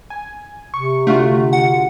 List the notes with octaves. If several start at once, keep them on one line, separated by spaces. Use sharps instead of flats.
G#5
C3 C#6
D3 A3 F4 F#4
F#5